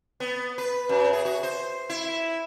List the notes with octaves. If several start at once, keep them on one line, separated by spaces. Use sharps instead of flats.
B3
B4
F#2
G#4
F#4
C5
E4